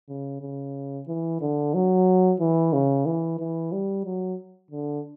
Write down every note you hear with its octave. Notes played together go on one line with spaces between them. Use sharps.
C#3
C#3
E3
D3
F#3
E3
C#3
E3
E3
G3
F#3
D3